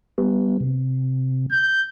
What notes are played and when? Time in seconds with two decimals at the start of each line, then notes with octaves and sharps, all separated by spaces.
0.18 G3 B3
0.60 C3
1.51 G6